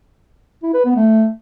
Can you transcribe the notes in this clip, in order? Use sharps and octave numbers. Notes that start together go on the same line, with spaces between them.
E4
B4
B3
A3